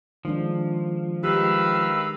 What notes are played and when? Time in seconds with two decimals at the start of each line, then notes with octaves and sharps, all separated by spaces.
0.25 D#3 F3 G#3 D4
1.24 D#3 G#3 G4 B4 F5 E6